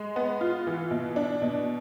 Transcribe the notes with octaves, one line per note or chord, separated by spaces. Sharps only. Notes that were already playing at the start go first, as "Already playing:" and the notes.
Already playing: G#3
B3
F4
E3
B2
D4
B2